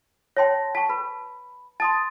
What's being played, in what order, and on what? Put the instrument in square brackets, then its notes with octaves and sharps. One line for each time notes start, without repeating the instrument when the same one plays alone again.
[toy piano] C#5 C6 [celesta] G5 A5 A#6
[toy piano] A5 C#6 [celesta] B6
[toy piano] B4 [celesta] B5
[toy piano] A5 [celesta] C6 D#6 A6